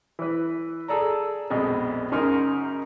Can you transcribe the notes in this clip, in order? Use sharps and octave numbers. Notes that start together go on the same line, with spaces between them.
E3 B4
G#4 A4 D5 A#5
A#1 F2 B2 G#3
F#2 C#3 D#4 A#4 G#5 C6